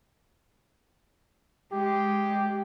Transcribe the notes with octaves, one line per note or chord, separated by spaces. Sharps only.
G#3 G4